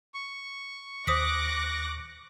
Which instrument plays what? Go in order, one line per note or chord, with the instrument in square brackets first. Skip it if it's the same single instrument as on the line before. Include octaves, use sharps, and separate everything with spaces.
[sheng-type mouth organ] C#6
[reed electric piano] D#2 [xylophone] C5 D#6 B6 [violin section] D6 F#6 A#6